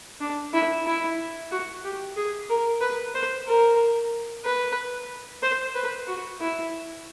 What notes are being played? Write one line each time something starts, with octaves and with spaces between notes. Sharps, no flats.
D4
E4
E4
F#4
G4
G#4
A#4
B4
C5
A#4
B4
C5
B4
F#4
E4